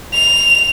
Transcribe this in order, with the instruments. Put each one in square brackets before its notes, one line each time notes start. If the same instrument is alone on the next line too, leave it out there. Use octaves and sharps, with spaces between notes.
[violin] F7